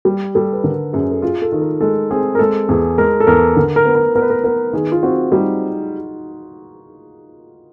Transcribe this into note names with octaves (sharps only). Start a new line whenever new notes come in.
G3
G3 A4
B4
D3 A#4
F#2 G#4
A4
F4 G#4
A4
D#3
A#4
G#3 A4
C4 G#4
A#4
G#3 A4
E2 G#4
G#3 A#4
A4
E2 A#4
D3 A#4
A#4
B3
A#4
B3 A#4
B4
A#4
B3 A#4
D#3 G#4
F4
C4 F#4
G3 D#4